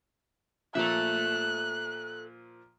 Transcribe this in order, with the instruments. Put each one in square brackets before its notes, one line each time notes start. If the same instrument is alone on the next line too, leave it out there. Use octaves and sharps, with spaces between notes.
[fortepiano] A#2 F3 [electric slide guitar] A4 E5 [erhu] F#6